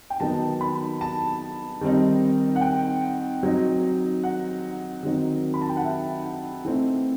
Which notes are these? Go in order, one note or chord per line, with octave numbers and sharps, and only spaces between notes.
G5
D#3 F#3 B3 D#4 A5
B5
A5
D#3 G3 C4 D#4
F#5
G5
F#3 C4 D#4
F#5
D#3 F#3 C4 D#4
B5
A5
G5
F#5
E5
E3 A3 C4 D#4